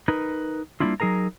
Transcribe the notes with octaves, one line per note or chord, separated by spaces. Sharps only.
D#4 A#4 B4
G3 G#3 A#3 D4 E4 F4
F#3 D#4 G#4 A#4 A#5